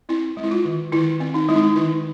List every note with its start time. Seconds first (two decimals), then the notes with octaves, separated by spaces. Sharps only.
0.09 C4 E4
0.37 G#3
0.44 E4
0.51 F4
0.65 D#3
0.92 D#3 E4
1.20 C4
1.34 D#4
1.49 G#3 E4
1.55 D#4
1.76 D#3 E4